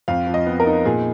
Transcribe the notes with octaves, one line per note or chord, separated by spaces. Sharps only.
F2 F5
F3
D#5
B3
A#4
D#4
A#2 G#4